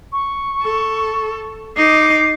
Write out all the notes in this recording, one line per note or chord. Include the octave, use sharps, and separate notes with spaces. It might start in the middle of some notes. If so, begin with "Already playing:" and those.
C#6
A4
D#4 D6 C7